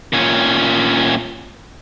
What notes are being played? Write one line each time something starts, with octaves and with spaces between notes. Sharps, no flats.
A#2 C#4